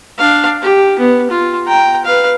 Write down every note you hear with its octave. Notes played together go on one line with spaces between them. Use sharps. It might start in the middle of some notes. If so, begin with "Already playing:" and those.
D4 F5
G4
B3
F4
G5 A#5
B4 F5